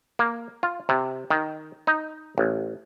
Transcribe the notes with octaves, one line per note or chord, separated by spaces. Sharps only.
A#3
F4
C3
D#3
D#4
A1